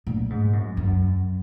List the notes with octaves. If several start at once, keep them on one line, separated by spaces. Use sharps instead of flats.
A#2
G#2
F#2
F#2